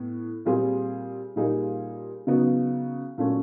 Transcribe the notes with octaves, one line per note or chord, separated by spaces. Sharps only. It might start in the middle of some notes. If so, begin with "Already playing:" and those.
Already playing: A2 B3
A#2 G3 C4 F4 G#4
A#2 G3 A#3 D#4 G#4
C#3 F#3 B3 D#4 F#4
A#2 F#3 A3 C#4